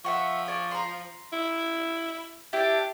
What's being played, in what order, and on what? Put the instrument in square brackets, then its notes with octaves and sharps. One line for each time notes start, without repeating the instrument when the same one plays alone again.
[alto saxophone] F3 [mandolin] E5 F#5 C#6
[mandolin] D5 G#5 C#6
A#5 C6
[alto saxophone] E4
[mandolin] D4 E4 [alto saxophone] G4